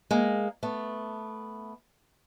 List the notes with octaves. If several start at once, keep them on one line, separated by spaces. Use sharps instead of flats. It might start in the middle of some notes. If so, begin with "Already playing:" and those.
G#3 A#3
A3 B3